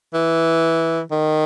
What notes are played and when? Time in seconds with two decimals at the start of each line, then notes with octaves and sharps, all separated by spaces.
0.14 E3
1.11 D#3